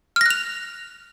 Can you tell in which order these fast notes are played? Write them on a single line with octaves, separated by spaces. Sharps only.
F6 A#6 F#6 F7